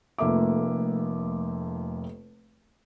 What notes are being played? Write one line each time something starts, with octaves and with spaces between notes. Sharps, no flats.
F1 F2 A3 A#3 E5 D6